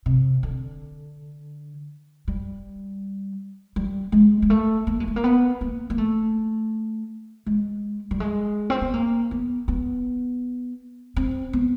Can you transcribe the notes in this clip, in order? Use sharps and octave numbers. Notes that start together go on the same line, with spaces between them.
C3
D3
G3
G3
G#3
G#3
A3
A#3
G#3
A3
A#3
B3
A#3
A#3
A3
G#3
G3
G#3
C4
B3
A#3
B3
B3
C4
B3